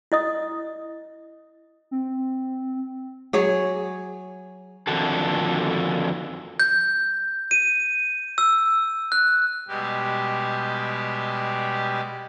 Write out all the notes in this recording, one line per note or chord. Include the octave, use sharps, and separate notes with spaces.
E4 D#5 D#6
C4
F#3 G#4 C#5
F2 D3 D#3 F#4 A4
G6
D#7
E6
F#6
B2 G3 G#3 G4